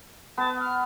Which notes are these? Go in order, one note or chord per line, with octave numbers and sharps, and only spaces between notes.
B3 A5
F6